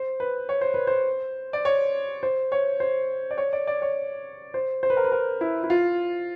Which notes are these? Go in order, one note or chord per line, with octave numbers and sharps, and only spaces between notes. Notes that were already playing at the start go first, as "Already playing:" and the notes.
Already playing: C5
B4
C#5
C5
B4
C5
D5
C#5
C5
C#5
C5
D5
C#5
D5
D5
C#5
C5
C5
B4
A#4
B4
A#4
E4
E4
F4